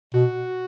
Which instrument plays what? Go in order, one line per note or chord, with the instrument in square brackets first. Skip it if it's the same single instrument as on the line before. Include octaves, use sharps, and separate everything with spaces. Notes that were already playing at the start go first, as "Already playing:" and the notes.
[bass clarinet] B2 [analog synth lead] F#4